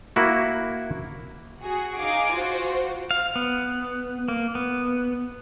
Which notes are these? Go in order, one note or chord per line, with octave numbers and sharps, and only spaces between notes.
A#3 E4 F#4
F#4 G#4
D#4 G#4 F5 G#5 D6
F4 F#4 C5
F5
B3
A#3
B3